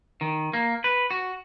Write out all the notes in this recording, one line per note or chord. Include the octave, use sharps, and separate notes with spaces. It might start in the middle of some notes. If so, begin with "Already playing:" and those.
D#3
A#3
B4
F#4